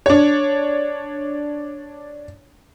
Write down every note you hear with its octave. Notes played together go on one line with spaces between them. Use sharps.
D4 C#5